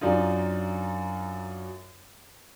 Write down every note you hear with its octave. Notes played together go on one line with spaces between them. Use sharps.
F#2 D4 D#4 F4